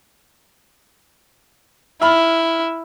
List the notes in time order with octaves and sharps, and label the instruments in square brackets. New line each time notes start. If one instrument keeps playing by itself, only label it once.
[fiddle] E4 [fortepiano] E5 B5 F6